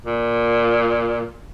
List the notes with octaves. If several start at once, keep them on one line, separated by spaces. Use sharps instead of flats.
A#2